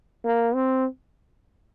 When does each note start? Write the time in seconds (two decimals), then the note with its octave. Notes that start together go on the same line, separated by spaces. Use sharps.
0.25 A#3
0.54 C4